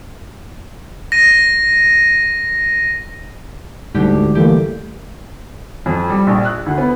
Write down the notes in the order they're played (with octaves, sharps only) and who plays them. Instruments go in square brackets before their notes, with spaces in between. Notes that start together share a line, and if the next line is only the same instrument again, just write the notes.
[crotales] A#6 D#7
[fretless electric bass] D2 G#2 [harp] D3 G3 G4
[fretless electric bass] E3 A3 A#3 [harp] G4
[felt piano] F2
G3
A#1
F#6
D2
B3